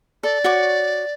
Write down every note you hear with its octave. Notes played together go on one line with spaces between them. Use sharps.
A4 D5
F#4 C#5 D6